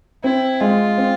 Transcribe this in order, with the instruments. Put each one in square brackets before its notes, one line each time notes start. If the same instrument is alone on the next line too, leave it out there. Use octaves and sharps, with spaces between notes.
[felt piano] C4 [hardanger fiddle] E4
[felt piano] G#3 [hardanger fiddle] F4
[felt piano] C4